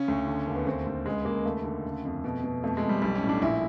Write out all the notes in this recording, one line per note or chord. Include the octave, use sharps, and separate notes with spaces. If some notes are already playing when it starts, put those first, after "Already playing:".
Already playing: C#3 C#4
D2
D3
D#2
B3
D2 C4
D2
C#2 G#3
C#2 A#3
D#2 A3
D3
C#3
F2
B2
B2
F2 A3
G#3
F2
G3
B1 G3
C#4
A2
D4
A#1 E4